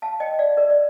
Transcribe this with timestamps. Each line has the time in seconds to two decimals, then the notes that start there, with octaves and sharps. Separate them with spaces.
0.02 F5 A5
0.20 D#5 G5
0.39 D5 F5
0.57 A#4 D5
0.70 D5